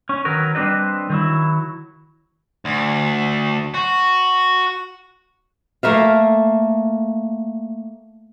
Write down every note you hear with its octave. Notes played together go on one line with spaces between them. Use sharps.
C#4
D#3 F#3 A#4 B4
G3 C4 D4 B4 D#5
D#3 F#3 E4
D2
F#4
A3 A#3 E5 F5